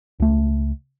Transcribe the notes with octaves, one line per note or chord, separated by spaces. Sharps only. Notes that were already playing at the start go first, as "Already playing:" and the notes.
C#2 A3